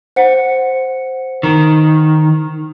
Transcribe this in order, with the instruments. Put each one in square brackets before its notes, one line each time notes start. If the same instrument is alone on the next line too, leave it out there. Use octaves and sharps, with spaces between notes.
[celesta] C5 F#5 C#7
[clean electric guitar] D#3